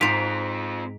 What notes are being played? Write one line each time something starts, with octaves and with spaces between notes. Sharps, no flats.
G#2 C4 F4 C5 B6 D7 F7